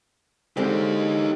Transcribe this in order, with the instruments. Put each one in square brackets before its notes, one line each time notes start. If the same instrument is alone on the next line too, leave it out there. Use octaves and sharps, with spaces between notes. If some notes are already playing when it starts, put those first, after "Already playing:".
[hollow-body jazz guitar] D3 G#3 C4 [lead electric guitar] D#4 G4